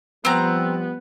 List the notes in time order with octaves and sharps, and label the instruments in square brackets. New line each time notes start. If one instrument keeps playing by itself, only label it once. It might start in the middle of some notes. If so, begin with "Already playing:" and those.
[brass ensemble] F3 G3 G4 [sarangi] B3 [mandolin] C4 A#5